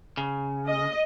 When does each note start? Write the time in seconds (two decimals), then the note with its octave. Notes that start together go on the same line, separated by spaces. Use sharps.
0.17 C#3
0.68 D#5